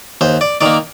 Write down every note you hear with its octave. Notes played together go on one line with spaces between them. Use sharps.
D#2 C5
D5
D#3 A#3 D5